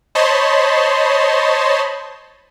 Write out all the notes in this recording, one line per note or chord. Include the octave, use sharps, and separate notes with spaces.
C5 C#5 D#5 A5 B5 C6